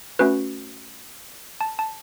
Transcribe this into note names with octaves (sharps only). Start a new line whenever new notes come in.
A3 C#4 F#4 B4
A5
A5